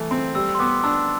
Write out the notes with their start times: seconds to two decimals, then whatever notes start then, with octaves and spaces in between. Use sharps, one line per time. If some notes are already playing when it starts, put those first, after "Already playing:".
Already playing: E3 A3
0.11 C4
0.35 G3 E6
0.55 C6
0.59 B3 D6
0.84 D4 E6